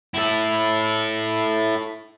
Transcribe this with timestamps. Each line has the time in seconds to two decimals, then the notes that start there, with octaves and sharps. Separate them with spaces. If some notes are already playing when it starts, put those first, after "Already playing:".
0.14 E4 A4